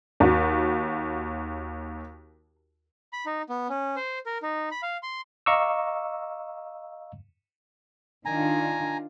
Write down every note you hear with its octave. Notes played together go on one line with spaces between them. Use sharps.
D#2 F#4
B5
D#4
B3
C#4
C5
A#4
D#4
B5
F5
C6
D#5 F5 A#5 C#6 D6 E6
D#3 D4 F4 G#5 A#5